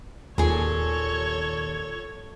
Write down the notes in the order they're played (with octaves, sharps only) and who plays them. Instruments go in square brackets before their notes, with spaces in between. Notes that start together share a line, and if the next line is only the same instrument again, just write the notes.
[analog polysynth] D#2 [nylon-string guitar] A#2 G#4 [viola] A4 C#5